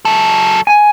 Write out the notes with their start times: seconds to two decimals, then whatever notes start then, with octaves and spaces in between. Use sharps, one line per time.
0.05 F#3 A4
0.67 G#5